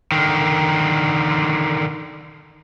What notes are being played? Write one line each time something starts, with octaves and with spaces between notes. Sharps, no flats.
D3 D#3